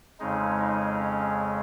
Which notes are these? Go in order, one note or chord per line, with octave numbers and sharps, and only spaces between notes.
F2 C#3 G#3 D#4
D#4
C#4